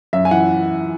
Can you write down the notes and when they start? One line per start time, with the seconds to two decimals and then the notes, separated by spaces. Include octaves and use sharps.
0.13 F#2 E5
0.25 G#5
0.31 E3 F#5